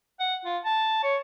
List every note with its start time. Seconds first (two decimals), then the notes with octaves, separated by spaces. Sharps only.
0.20 F#5
0.45 F4
0.65 A5
1.03 C#5